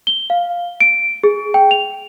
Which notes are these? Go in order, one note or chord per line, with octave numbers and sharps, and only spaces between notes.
G7
F5
D7
G#4
G5
F7